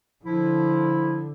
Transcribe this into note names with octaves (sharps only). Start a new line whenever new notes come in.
D3 F3 E4